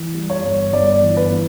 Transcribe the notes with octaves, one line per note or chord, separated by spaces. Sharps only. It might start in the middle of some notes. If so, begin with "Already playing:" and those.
Already playing: E3
G3
C#5
G1
G1 D5
E3
B4
E3